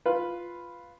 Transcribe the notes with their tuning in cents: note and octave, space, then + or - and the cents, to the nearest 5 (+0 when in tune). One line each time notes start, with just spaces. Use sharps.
F4 +0 B4 +0